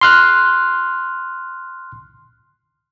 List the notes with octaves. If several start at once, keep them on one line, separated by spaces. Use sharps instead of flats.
C6 F6 F#6